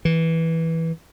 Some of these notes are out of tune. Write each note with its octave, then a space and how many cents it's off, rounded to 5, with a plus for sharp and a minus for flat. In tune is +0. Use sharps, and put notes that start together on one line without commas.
E3 -10